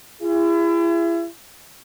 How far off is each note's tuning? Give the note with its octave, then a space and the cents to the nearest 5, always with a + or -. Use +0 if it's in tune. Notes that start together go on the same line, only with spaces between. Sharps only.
E4 +35 G#4 -30